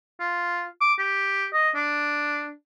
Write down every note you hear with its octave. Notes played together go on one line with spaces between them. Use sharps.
F4
D6
G4
D#5
D4